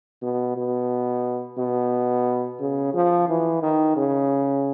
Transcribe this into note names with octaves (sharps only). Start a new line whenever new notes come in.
B2
B2
B2
C#3
F3
E3
D#3
C#3